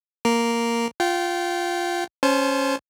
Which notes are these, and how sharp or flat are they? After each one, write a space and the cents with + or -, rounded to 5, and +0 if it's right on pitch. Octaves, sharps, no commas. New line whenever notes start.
A#3 +0 A#4 +0
F4 +0 G5 -25
C#4 -5 C5 +0 A5 -40